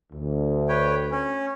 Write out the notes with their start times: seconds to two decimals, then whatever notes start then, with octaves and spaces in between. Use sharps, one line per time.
0.11 D2
0.69 B4 C#5 G5
1.11 C#4